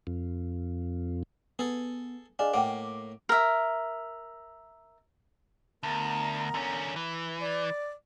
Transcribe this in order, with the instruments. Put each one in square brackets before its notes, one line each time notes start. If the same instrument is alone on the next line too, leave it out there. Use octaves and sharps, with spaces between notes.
[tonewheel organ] F2
[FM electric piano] B3 [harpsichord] G#4 A4
[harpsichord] D4 [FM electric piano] G#4 D5 F5 [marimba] D#5 G#5
[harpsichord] A2 A#3 [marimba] F#5 G5 [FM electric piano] D6
[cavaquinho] A#4 E5
[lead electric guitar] D2 [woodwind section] B3 A#4 A#5
[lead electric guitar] D3 C#4
E3
[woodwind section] D5